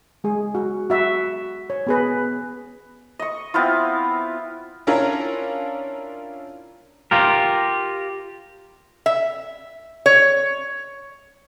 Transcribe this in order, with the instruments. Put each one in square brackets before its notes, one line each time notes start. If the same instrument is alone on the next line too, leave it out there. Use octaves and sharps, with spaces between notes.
[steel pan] G#3 G#4
F#4
F#4 E5
C#5
B3 G#4 B4
[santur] D#5 C#6
B3 C4 E4 F4
[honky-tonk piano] C#4 D4 E4 F4 A#4 C#5
[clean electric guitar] F4 G4 A#4
[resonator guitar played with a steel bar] E5
C#5